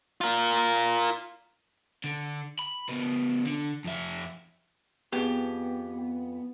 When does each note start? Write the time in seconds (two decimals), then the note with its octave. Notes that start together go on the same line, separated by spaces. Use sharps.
0.21 F4 A#4
2.04 D3
2.59 B5
2.89 C#3 B3
3.46 D3
3.84 F2 E5
5.12 F2 B3 G4 G#4